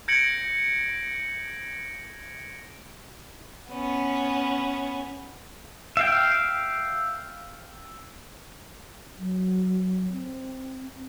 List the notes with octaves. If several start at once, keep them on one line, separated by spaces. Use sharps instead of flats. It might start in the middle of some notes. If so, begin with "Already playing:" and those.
G6 G#6 A#6 C#7 D7 F#7
B3 C#4
E5 F5 G5
F#3
C4